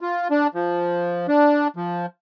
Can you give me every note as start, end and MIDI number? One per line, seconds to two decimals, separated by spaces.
0.01 0.28 65
0.31 0.47 62
0.54 1.27 53
1.28 1.68 62
1.76 2.06 53